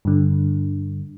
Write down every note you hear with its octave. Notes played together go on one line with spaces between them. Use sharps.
G2 D3